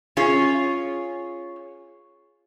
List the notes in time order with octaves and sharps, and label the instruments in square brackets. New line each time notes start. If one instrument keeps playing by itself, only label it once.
[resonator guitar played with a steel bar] C#4 F4 G#4